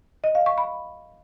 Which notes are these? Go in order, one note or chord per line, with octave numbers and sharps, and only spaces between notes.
D#5
F5
C#6
B5